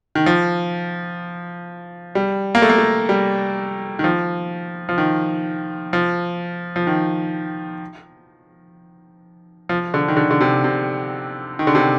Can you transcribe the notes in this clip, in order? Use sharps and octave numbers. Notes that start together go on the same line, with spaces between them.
D#3
F3
G3
A#3
A3
A#3
A3
G3
D#3
F3
F3
D#3
F3
F3
D#3
F3
D3
D#3
D3
D3
C3
C3
D#3
D3
C3